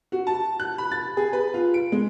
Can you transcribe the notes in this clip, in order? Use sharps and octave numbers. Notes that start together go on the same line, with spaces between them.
F#4
A5
F#6
B5
A6
G#4
B4
F4
D7
G#3